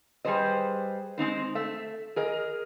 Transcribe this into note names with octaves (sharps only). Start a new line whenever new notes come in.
G3 G#4 B4 C5 D#5
G#3 C4 D#4 C5
A3 E5
G#4 A#4 D#5